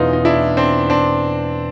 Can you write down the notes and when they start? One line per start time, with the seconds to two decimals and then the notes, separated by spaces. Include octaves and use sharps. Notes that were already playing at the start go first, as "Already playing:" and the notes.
Already playing: E2 B2 G#3 C#4 D#4 F4
0.13 D#4
0.25 D4 E4
0.57 C4 D4
0.90 C4 D4